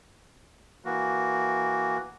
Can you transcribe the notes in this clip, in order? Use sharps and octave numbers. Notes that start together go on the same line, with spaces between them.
E3 A#3 F#4